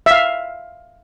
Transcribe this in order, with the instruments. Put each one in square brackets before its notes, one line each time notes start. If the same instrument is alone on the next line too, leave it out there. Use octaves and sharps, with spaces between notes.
[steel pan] E5 F5